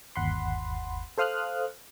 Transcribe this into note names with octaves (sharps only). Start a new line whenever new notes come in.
G1 D#2 F#5 B5 C6
A4 C5 F5 D#6 F6 F#6